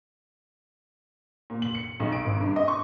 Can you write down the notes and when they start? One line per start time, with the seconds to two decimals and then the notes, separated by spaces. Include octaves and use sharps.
1.50 A#2
1.62 F#7
1.75 C#7
2.00 B1
2.12 D7
2.25 G#1
2.41 G2
2.56 D#5
2.68 C#6